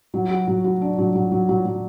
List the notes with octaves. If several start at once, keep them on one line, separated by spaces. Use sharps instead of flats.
F#3
F#4
F#3
F#4
D4
F#3
F#3
F#3
F#3
F#3